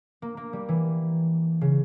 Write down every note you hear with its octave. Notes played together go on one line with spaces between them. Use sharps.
A#3
A#3
G3
E3
C#3